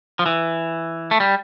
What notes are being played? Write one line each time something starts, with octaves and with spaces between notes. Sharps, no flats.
F3
E3
A3
G3